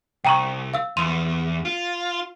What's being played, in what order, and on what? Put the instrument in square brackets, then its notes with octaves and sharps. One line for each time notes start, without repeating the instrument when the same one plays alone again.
[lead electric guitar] C2 [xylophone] G5 A#5 C#6
[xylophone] F5 E6
[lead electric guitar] E2 [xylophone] C6 D#7 F7
[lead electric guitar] F4